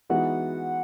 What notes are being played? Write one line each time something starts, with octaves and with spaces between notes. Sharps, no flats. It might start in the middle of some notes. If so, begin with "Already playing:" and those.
E3 G#3 B3 D#4 F#4 F#5